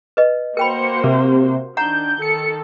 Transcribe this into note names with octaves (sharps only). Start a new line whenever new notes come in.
B4 D#5
A#3 F#4 A#4 C5 G5 B5 C#7
C3 A#4
D#3 D4 F#5 A#5 G6
D#3 A4 C#7